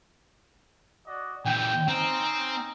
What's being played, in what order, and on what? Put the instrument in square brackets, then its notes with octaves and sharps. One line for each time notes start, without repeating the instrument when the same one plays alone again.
[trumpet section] F#4 D5 D#5
[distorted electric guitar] A#2 E3 [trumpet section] G5
[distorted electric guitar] C4 [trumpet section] C#4 D#4